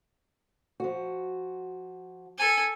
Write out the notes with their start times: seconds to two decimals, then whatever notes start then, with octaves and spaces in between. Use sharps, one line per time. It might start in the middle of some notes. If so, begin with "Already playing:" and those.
0.80 F3 F#4
2.38 A4 G#5